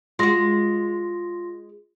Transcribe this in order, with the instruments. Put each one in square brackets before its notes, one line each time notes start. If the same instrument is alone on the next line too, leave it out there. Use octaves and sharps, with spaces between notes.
[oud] G#3 F#4 [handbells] F4 C6 A#6